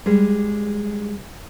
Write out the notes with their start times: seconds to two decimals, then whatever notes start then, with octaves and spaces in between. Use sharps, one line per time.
0.06 G3 G#3